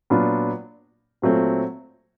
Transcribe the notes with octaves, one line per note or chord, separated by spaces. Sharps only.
A#2 F#3 B3 D4 F4
A#2 F#3 A3 C4 F4